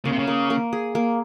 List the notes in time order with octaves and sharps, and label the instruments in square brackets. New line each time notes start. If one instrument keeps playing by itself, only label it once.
[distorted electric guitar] C#3 [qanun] A#3
[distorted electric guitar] C3
C#3
[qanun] A#3
A#3
G#4
A#3